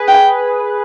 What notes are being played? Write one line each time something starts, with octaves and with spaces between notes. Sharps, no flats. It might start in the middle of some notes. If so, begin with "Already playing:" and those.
Already playing: G#4 B4
G5